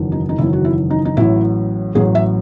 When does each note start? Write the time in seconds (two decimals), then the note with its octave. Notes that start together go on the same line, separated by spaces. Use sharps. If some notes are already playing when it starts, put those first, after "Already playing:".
Already playing: F#1 E2 D#3 F#3
0.12 D#4
0.29 D#4
0.38 F#1 E2 D#3 F#3 E4
0.53 F#4
0.65 E4
0.90 D#4
1.05 D#4
1.17 A1 A2 F#3 E4
1.95 A1 A2 F#3 G#4
2.15 E5